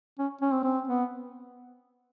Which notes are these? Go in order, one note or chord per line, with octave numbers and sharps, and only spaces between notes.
C#4
C#4
C4
C4
B3